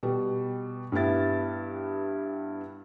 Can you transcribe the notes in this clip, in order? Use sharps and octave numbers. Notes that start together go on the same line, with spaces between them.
B2 G3
G2 G3 B3 E4 A6